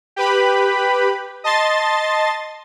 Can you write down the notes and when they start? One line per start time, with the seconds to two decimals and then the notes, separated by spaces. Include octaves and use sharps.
0.16 G4 B4 B5
1.44 D#5 A5 C6 A6